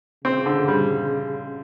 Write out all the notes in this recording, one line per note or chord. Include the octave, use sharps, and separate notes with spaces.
C#3 C4
D3
G3